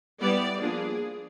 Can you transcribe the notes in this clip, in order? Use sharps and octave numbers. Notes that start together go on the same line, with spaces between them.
G3 B3 E4 D5
F3 A#3 D4 G#4